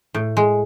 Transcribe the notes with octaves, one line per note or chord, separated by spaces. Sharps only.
A2
G#3